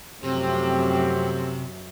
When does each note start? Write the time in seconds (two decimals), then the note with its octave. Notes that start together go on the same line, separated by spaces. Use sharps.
0.24 F#2 C3 F3 A3 C4 G4